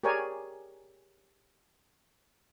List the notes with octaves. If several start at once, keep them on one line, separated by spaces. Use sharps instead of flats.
G4 G#4 A#4 C#5 D5 G#5